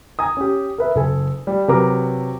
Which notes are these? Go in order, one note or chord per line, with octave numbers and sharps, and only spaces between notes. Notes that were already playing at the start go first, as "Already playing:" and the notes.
G#5 A#5 D#6
C#4 G4
A#4 B4 E5
F#1 A4 G#5
G3
C3 F#3 A#4 B4 A#5 D6